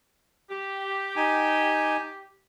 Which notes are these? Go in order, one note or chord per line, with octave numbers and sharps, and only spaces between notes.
G4
D#4 G#5